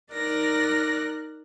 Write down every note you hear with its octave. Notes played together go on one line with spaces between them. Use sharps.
D#4 A#4 D5 F#6 A#6